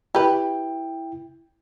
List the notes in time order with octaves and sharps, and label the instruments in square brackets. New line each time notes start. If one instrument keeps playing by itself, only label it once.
[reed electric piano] E4 G5 [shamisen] G4 B4